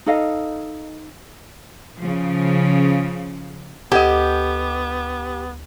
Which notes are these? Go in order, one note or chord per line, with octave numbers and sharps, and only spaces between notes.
D#4 A4 D#5 F5
C#3 F3
D2 B3 G4 A4 D#5 F#5 G#6